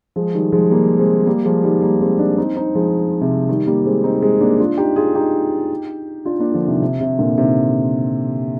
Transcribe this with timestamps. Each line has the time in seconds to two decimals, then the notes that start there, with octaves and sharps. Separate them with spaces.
0.16 F3 G#3
0.34 D#3 G3
0.52 F3 G#3
0.71 G3 A#3
0.99 G#3 C4
1.26 G3 A#3
1.45 F3 G#3
1.64 D#3 G3
1.82 G3 A#3
2.01 G#3 C4
2.19 A#3 D4
2.37 C4 D#4
2.56 C4 D#4
2.75 F3 G#3
3.21 C3
3.49 D#3 G3
3.67 G3 A#3
3.86 G#3 C4
4.04 C4 D#4
4.22 G#3 C4
4.41 A#3 D4
4.60 D4 F4
4.77 D#4 G4
4.96 F4 G#4
5.15 D#4 G4
6.26 D4 F4
6.39 A#3 D4
6.54 D3 F3
6.67 C3 D#3
6.82 C3
7.01 C3
7.19 A#2 D3
7.37 C3 D#3